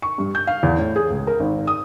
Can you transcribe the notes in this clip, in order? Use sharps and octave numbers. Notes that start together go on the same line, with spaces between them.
C#6
G2
G6
F5
E2
A2
G#4
C#2
A#4
G#1
D#6